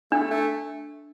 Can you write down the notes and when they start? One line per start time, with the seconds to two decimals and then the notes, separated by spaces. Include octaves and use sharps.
0.12 A3 D4
0.31 A3